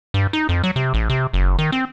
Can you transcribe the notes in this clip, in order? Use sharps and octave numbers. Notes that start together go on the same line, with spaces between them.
G2
D#4
F2
F#3
C3
A1
C3
F#1
D#3
C4